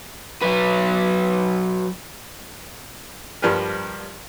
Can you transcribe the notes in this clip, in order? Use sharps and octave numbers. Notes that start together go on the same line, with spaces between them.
F#3 B4
G2 F3 G3 A#4 B4